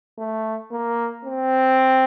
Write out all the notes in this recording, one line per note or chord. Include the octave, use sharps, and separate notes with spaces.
A3
A#3
C4